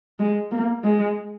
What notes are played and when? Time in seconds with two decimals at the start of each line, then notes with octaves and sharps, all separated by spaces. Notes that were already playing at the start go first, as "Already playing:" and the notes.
0.19 G#3
0.52 A#3
0.84 G#3